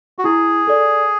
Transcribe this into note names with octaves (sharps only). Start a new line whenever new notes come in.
F#4
E4 G#4
A4 D5